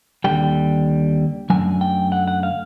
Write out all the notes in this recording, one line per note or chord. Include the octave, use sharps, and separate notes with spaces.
D#2 D3 G3 G5
F#2 D3 F#3 A3 G#5
G5
F#5
F#5
F5